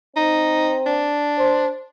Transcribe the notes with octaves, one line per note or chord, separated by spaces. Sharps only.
C4 D#4
D4
C5